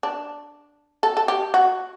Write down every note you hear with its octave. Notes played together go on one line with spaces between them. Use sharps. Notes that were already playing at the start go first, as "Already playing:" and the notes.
D4
A4
A4
G4
F#4